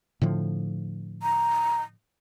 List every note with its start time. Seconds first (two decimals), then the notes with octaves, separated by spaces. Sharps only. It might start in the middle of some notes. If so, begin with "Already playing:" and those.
0.22 A2 D3 F3
1.23 A#5